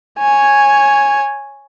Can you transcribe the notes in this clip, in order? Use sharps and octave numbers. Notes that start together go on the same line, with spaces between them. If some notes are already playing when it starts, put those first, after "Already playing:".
C#5 G#5